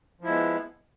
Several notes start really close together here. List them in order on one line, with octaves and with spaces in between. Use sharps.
F3 E4 G#3 B3